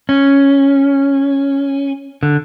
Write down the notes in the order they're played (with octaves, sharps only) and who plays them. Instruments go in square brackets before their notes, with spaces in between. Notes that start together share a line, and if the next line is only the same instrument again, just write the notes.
[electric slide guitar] C#4
D3